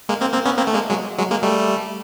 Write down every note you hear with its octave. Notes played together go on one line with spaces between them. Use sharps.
G#3 A#3
A#3 C4
A#3 C4
B3 C#4
A#3 C4
A3
G#3 A#3
F#3 G#3
F#3 G#3
G#3 A#3
G3 A3